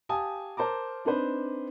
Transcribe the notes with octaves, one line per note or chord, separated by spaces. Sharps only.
G4 F5 G#5 A5 D#6
A#4 C5 A5 A#5 D6
C4 D4 D#4 B4 C5